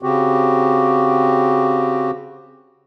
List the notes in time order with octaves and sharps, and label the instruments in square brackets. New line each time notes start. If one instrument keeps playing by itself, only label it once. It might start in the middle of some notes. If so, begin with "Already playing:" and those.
[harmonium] C#3 C4 F#4 G4